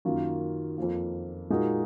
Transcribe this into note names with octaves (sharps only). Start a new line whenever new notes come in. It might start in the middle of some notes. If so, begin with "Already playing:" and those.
F#2 D#3 A#3 F4
F2 F3 A#3
A#2 G#3 D#4 F#4 A#4